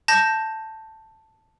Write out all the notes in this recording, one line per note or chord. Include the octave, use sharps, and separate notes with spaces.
A5 G6 A#6